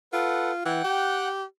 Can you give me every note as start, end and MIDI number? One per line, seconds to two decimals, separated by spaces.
0.13 0.63 65
0.13 0.51 69
0.13 0.51 71
0.13 0.51 78
0.65 0.80 52
0.65 1.28 78
0.65 1.28 79
0.65 1.28 90
0.84 1.44 67